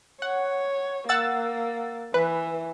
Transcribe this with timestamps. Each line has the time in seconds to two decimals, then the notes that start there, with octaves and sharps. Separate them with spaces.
0.22 C#5 F#5
1.09 A#3 F#5 E6 A6
2.14 E3 B4